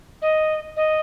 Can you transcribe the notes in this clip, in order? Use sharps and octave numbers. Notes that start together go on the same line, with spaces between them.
D#5
D#5